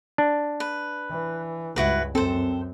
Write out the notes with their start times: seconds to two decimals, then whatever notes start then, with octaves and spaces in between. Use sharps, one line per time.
0.18 D4
0.60 B4
1.10 E3
1.76 C#2 G2 E4 F#4 B4
2.15 F#2 C4 A4 C5